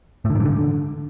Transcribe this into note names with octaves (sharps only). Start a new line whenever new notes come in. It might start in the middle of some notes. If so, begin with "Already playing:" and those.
A2
D3
D#3
G2
D3